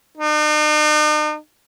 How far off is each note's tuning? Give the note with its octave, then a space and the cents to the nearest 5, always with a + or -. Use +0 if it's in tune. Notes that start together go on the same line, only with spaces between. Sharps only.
D#4 -45